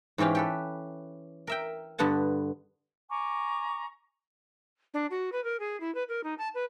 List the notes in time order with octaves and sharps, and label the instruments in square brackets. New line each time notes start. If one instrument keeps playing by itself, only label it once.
[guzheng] G#2 E3 C#4 G4 F5
G4 A4 B4
A#4 E5 G5
G2 D3 B3 F#5 A5
[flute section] G#5 A#5 C#6 D6
[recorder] D4
F#4
B4
A#4
G#4
E4
B4
A#4
D#4
A5
B4